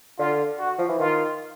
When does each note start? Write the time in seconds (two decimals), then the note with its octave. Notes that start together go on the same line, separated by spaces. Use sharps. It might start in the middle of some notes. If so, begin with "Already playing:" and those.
0.18 D3 F4
0.59 F#4
0.78 F3
0.89 E3
0.99 D#3 F4